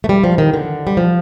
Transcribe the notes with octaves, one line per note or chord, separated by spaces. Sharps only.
A3
G3
F3
D#3
D3
G3
F3